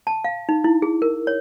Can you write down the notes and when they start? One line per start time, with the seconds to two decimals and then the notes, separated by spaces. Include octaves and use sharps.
0.07 A5
0.24 F5
0.49 D#4
0.64 E4
0.82 G#4
1.02 A#4
1.27 C#5